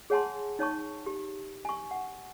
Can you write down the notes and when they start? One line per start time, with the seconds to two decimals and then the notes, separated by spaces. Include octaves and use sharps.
0.10 G#4 C#5 F#5 G#5 A5 C6
0.59 D#4 C#5 A5 C#6
1.06 G4
1.65 G#5 C#6
1.91 F#5